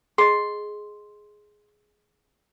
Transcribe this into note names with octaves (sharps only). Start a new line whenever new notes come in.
G#4 D#5 C6